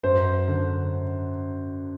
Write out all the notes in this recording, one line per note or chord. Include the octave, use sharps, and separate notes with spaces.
F#2 C5
D3